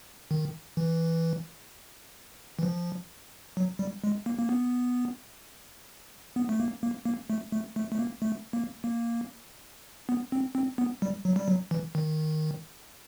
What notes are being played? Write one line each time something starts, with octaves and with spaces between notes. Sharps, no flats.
D#3
E3
E3
F3
F#3
G3
G#3
A#3
A#3
B3
B3
A3
A#3
A#3
A#3
A3
A3
A3
A3
A#3
A3
A#3
A#3
B3
C4
C4
B3
G3
F#3
G3
F#3
E3
D#3